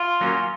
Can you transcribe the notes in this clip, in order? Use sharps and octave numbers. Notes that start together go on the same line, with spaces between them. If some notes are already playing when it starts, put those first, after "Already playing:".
Already playing: F4
F#3 A#3 C#4